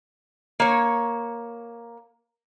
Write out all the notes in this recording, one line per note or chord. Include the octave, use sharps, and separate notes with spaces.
A#3 C#5